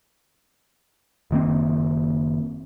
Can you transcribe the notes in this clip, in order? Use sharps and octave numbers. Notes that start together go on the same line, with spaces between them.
F#1 D#3 A#3 C4